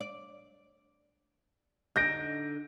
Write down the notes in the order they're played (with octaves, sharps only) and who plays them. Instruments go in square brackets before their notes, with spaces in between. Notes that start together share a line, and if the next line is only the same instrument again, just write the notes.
[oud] D5
[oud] D3 D#4 [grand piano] G6 A#6 D7